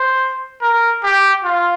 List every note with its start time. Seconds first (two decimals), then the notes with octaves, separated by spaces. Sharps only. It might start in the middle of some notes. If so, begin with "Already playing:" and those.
Already playing: C5
0.62 A#4
1.04 G4
1.44 F4